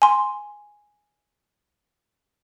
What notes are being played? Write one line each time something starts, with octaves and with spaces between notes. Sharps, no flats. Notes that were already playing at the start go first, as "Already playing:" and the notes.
G#5 C6